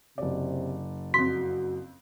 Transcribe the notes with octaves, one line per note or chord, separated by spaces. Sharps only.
F#1 C3 D5
F2 F#4 C6 B6